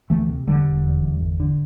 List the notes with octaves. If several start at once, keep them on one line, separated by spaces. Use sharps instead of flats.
D2 E3 A3
C3
E1 D3 G3
E1
E2
E2
G1
D3